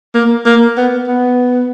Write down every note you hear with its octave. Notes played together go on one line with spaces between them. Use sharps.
A#3
A#3
B3
B3